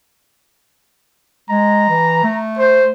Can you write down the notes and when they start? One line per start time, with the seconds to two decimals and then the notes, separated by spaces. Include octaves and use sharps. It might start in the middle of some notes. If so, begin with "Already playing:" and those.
1.50 G#3 A#5
1.89 E3
2.23 A3
2.59 C5